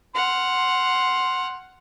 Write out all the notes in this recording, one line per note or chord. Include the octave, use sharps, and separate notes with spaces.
F#5 C6 F6